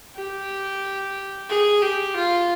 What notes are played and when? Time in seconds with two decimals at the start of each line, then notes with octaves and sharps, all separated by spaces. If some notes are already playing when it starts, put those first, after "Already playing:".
0.15 G4
1.49 G#4
1.82 G4
2.15 F4